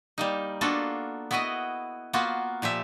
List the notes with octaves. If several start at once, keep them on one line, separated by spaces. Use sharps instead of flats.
G3 A#3 D#4
A#3 B3 D4 F4 F#4 A4
B3 E4 F#4 B4 D#5
A#3 B3 F4 F#4
A#2 F3 G4 E5